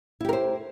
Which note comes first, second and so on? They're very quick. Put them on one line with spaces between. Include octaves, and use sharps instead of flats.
E4 G4 A#4 C5